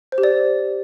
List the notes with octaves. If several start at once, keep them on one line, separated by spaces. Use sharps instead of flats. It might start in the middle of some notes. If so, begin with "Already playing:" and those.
C5
G4
D5